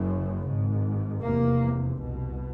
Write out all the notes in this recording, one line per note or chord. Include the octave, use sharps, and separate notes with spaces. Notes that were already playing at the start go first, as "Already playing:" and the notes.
Already playing: F#1 F#2 C#3
G#1 G#2
F1 E2 C3 A#3
C2 B2